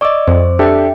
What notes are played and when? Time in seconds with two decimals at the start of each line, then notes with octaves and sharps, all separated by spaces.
0.01 D5 D#5 C#6 D6 E6
0.28 F2 C5
0.59 D4 G4 A4 E5 G5